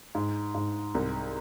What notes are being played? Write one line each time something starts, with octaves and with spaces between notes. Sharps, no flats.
G#2
G#2
C2